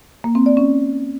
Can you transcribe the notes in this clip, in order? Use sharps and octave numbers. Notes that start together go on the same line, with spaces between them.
A#3
C4
D5
C#4